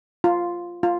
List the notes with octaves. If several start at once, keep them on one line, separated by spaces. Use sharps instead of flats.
F4
F4